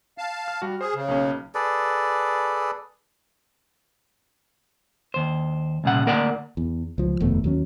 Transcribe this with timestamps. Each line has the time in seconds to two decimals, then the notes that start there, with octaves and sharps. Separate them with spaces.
0.18 F5 A5
0.48 F6
0.62 G3 F#4
0.81 G#4 C5
0.95 C#3
1.08 B1 A#3 C#4
1.55 G#4 A4 B4 D5
5.14 D#2 C5
5.84 C2 A#2 C#3 F#5
6.06 D2 A#3 A#4 D5 F#5
6.57 E2
6.98 C#2 F3
7.20 F1 D#2 B2 A3
7.44 D#2 F#3 C#4